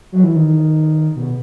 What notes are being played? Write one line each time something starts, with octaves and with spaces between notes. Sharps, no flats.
F#3
E3
D#3
B2